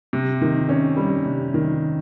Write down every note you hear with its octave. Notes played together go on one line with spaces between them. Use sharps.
C3
D#3
C#4
G3
C3
D#3